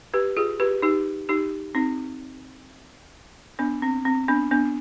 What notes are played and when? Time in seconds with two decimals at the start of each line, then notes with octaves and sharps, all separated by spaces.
0.14 G4 B4
0.37 F4 G#4
0.60 G4 B4
0.82 D#4 G4
1.29 D#4 G4
1.75 C4 D#4
3.59 B3 D4
3.82 C4
4.05 C4
4.28 B3 D4
4.51 B3 D4